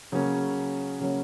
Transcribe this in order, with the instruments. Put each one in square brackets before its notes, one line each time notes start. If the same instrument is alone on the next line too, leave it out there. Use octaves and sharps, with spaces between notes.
[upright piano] C#3 F#3 A#3 C#4
C#3 F#3 A#3 C#4